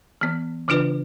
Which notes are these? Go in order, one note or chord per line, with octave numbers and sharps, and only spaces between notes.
E3 B3
C#3 E3 D4 F4 B4